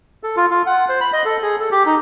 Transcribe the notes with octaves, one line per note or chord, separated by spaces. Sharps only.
A4
F4
F4
F#5
C5
B5
D#5
A4
G#4
A4
G4
D#4